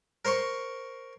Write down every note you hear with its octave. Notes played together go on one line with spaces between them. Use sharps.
A#4 C5 C6 C#6